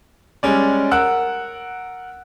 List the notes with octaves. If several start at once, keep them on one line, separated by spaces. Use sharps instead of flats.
G3 G#3 C#4 D5
A#4 F#5 E6 F#6